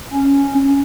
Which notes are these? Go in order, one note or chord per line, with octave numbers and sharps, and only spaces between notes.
C#4